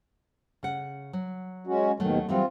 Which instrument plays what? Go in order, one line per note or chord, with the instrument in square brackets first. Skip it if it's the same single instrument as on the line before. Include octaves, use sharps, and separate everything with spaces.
[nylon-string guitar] C#3 F#5
F#3
[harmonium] G#3 C#4 F#4
[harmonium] D#2 B2 D#3 [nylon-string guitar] F#3 A3
[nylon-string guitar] E3 F#3 G3 [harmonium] C4 F4